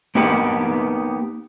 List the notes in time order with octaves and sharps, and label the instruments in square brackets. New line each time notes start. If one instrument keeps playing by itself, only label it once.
[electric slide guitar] A#3 B3 D#4 G4 B4